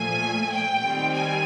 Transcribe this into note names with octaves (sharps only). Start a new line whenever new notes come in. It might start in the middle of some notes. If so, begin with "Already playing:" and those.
Already playing: A#2 F3 A3 G#5
G5
D#3 G3 C4
G#5